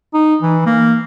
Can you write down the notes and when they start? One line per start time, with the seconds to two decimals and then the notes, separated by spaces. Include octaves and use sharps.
0.14 D#4
0.42 E3
0.66 A#3